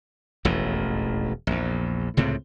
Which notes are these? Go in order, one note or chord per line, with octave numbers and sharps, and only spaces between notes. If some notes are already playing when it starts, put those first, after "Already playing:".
E1 A1 F2 A2
A#1 E2
C#2 A2 C3 C4